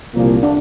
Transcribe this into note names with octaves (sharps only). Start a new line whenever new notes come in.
C2 A#2 F3 A#3
D4